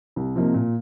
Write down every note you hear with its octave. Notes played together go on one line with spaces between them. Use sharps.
C2
C3 F3 A#3 D#4
A#2